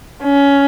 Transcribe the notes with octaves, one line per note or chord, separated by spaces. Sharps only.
C#4